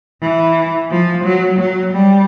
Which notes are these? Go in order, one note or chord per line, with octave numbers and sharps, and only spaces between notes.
E3
F3
F#3
F#3
G3